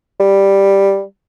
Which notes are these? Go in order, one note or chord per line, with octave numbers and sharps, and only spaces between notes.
G3